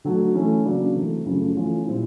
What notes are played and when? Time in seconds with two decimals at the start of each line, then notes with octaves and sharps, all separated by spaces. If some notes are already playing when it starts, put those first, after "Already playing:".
0.04 D3 F#3 A3
0.35 E3 A3 C#4 E4
0.65 C#3 F#3 A#3 D4
0.95 C3 E3 A3
1.25 F#2 C#3 F3 A3
1.55 E3 A3 C#4 F4
1.85 A#2 G3 C4 E4